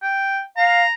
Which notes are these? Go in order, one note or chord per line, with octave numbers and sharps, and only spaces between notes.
G5
F5 A#5